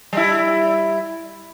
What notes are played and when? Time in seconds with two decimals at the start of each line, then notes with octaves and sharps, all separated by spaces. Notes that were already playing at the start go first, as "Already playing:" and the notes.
0.13 G3 E4